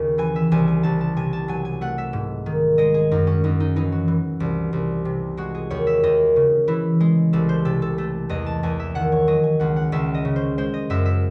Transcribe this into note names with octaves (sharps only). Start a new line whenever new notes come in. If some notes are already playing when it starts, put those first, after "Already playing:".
Already playing: D#2 C#3
E3 G#5
E5
C2 G#5
G#5
C2 A5
A5
C3 G#5
A5
F#3 G#5
G#5
A3 F#5
E5
G#2
D#3
G#3 D#5
G#4
F#2 D#4
C#4
F#2 D#4
D#4
E3 D#4
F#4
E3
C2
C2
C3
G#3 F#4
G#4
D#2 C#5
E5
D#2 D#5
C#3
E3 E4
G#3
C2 A4
C5
C3 A4
A4
A3 A4
E2 D#5
A5
E2 G#5
E5
D#3 F#5
C#5
F#3 D#5
G#5
C#2 F#5
F#5
C#2 E5
D#5
C#3
C5
G#3 C5
D#5
F#2 E5
E5